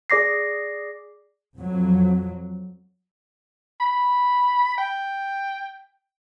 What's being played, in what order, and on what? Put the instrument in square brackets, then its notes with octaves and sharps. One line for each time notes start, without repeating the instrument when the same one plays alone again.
[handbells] G#4 D5 D6 A#6 C7
[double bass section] F2 F#3
[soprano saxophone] B5
G5